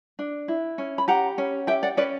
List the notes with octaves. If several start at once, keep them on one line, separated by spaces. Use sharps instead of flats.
D4
E4
C#4
B5
G4 F#5 A#5
C#4
G4 E5 G5
D5 F#5
C#4 B4 D5